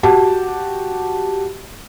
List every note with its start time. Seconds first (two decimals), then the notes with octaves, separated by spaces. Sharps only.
0.03 F#4 G4 A5